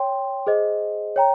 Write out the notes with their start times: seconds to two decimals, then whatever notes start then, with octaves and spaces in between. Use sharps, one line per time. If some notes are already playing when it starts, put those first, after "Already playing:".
Already playing: C#5 G5 C6
0.47 G#4 C5 D#5
1.16 C#5 G5 A#5